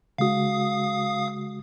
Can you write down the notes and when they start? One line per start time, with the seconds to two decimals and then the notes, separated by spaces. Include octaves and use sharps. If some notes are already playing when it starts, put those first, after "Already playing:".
0.18 C#3 G#3 F#4 F5 D#6